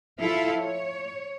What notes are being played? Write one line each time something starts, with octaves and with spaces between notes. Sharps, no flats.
F3 E4 F4 A4 E5 F5
C#5